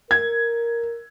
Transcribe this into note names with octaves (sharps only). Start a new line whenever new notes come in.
A#4 G#6